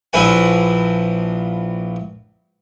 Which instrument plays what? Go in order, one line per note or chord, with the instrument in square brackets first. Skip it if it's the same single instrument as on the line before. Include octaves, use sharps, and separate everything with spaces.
[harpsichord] A#1 F3 E4 B4 G#5